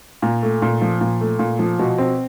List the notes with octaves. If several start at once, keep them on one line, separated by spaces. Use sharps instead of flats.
A#2
A3
A#2
F3
A#2
A3
A#2
F3
B2
C4